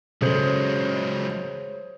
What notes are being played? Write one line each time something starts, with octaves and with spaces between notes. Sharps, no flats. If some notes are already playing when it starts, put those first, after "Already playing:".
C#3 F#3 G#3 G#4 A4 C5 C#5